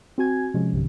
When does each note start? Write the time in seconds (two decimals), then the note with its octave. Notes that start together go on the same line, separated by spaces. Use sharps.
0.18 C4 F#4 G#5 G#6
0.54 C3 F3 G#3 C#4
0.72 B1 G2 C3 D#3